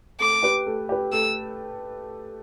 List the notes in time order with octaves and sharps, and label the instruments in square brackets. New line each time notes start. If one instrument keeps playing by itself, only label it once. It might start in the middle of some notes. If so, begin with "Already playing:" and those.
[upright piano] A3 [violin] D6
[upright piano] G4 B4
A3
G4 B4
[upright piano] A3 [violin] E6